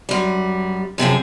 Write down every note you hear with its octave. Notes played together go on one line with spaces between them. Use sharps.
F#2 G3
F#2 C3 F3 G#4